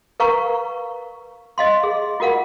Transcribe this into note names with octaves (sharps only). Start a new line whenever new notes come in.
A#4 B4 F5 A#5 C#6
D#5 F5 C6
G#4
F4 F#4 A#4 F5 F#5